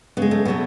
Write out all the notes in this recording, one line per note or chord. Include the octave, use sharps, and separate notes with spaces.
C#3 G#3 B3
A3
B2 F#3 A3 B3